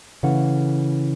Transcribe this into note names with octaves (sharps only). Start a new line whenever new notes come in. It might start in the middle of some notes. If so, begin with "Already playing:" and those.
C#3 E3 A3 F#5